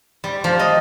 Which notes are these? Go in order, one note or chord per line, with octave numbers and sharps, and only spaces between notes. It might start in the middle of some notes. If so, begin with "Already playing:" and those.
G3
F3
D#5